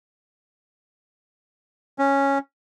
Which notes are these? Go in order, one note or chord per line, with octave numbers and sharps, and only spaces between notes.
C#4